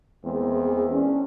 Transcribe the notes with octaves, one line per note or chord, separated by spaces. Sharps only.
E2 G#3 A#3 C4
C#4 D4